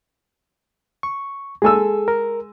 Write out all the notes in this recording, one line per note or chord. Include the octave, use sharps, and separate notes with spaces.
C#6
G#3 G#4 A4 G#5 E6
A#4